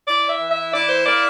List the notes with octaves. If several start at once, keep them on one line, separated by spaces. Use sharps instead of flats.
E4 D5
E5
E3
E5
E4 D5
C5
A#3 D5